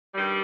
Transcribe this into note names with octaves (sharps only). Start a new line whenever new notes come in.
G2 D#3 G3